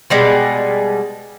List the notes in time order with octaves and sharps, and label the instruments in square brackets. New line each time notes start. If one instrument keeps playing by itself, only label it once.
[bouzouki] B2 G3 G#3